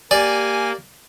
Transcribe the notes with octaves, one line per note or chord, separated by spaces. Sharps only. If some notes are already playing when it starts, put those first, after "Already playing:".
A#3 G4 D5 G#5